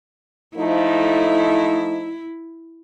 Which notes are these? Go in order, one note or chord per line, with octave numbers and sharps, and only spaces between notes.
F3 A3 D#4 E4